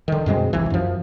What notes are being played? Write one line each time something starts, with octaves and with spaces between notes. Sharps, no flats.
D3 D#3
F#2 B2 G#3 C4
E1 C2 E3
F#2 F3